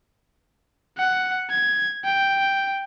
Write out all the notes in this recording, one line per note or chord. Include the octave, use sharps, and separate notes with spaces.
F#5
G#6
G5